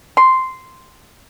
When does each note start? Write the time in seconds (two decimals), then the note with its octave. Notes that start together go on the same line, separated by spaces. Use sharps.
0.17 C6